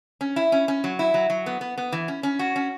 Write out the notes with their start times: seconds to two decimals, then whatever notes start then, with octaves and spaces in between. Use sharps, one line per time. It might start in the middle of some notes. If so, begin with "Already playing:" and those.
0.21 C#4
0.36 E4
0.52 C#4
0.68 C#4
0.84 F#3
0.99 E4
1.14 F#3
1.30 F#3
1.46 B3
1.61 B3
1.78 B3
1.92 E3
2.08 C#4
2.23 C#4
2.39 F#4
2.56 C#4